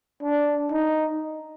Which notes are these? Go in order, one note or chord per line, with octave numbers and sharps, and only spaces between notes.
D4
D#4